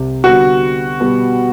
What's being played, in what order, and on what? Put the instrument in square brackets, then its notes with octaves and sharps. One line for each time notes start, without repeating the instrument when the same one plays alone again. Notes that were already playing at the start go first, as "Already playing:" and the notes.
Already playing: [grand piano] C2 C3 G4
[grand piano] D3 G3 B3 [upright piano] F#4
[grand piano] B2 G3 B3